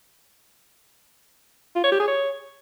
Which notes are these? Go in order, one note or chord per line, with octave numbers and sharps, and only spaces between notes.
F4
C#5
G4
G#4
C#5